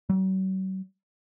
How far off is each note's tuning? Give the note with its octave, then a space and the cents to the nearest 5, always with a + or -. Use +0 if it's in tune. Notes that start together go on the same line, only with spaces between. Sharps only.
F#3 +40